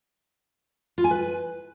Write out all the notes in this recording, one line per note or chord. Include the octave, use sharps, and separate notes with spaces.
F4
G#5
B4